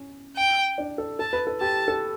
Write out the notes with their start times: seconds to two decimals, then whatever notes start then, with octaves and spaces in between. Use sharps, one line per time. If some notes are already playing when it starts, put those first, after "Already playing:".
Already playing: C#4
0.37 G5
0.78 D4
0.98 A4
1.19 A4 A5
1.33 B4
1.47 A4
1.61 G4 A5
1.88 A4